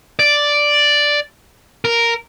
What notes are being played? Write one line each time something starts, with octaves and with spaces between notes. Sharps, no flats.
D5
A#4